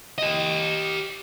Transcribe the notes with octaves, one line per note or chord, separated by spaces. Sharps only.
G4 D#5